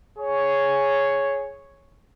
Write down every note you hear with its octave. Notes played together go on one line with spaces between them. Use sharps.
G#4 C#5